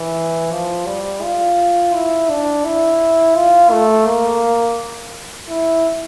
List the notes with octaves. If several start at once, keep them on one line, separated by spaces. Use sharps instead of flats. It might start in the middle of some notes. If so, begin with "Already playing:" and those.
Already playing: E3
F3
G3
F4
E4
D4
E4
F4
A3
A#3
E4